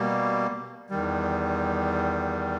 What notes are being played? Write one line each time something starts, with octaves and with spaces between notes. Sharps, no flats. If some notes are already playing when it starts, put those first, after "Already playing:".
Already playing: B2 G3 A#3
E2 D#3 G3